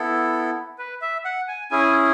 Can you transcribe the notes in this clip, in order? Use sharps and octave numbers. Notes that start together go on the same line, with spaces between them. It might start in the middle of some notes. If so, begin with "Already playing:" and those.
Already playing: B3 E4 A4
B4
E5
F#5
G#5
C#4 E4 G#4 G#5